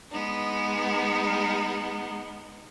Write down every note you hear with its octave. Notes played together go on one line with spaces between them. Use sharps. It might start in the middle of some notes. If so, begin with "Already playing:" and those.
G#3 B3 D#4